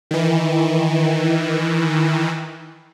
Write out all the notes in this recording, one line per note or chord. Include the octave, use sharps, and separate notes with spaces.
D#3 E3